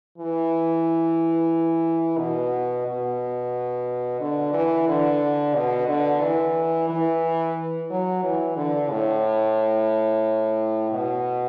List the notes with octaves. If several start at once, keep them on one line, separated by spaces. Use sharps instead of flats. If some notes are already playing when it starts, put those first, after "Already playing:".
E3
B2
B2
D3
E3
D3
B2
D3
E3
E3
F#3
E3
D3
A2
B2